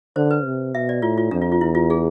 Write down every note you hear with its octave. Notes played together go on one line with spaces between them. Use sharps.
D3 C5
B4
C3
B2 E5
D5
A2 F4
F4
F2 D4
F4
F4
E2 E4
F4
G#4